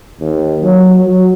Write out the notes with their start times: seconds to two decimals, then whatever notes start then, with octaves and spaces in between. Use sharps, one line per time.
0.20 D#2
0.61 F#3
1.05 F#3